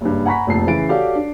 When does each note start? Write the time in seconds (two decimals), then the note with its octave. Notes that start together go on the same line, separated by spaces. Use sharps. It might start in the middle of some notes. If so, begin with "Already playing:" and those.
0.01 F#1 G2
0.26 F#5 G#5 A#5 B5 C#6 B6
0.47 F1 A#1 F2 A5 C7
0.67 C#3 E3 E4 A6 D7
0.89 F#4 G4 A4 C#5 D5 F5
1.15 D4